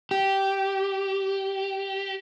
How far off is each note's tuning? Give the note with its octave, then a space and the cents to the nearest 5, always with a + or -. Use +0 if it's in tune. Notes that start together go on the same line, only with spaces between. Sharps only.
G4 -10